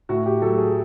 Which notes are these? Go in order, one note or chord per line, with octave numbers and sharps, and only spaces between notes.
A2 F#4
G4
F#3 A4
G#4